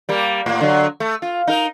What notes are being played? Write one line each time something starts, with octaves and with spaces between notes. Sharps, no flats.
G3 A#3
A2 A#3
D3 F#3
A3
F4
D#4 A#4